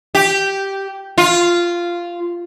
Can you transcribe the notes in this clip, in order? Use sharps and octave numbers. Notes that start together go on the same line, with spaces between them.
G4
F4